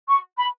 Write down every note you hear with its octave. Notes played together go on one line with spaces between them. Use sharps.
C#6
B5